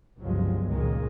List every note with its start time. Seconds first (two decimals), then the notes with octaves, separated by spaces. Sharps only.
0.20 G1 C#2 G2 F3 F#3 G#3
0.69 C#2 A#2 D#3 G#3